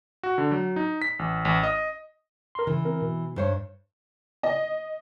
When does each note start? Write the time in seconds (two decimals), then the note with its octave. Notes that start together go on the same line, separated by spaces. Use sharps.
0.23 F#4
0.38 D3
0.51 F#3
0.76 D#4
1.02 B6
1.19 A1
1.45 A1
1.63 D#5
2.55 A#4 C6
2.67 C#3 E3
2.85 C4 A#4
3.02 B2
3.36 G2 C5 C#5
4.43 D#5